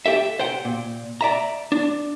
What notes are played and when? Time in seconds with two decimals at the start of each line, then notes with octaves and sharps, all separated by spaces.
0.06 G4 A4 E5
0.39 C5 F#5 G5
0.65 A#2
1.21 D5 E5 A#5
1.72 D4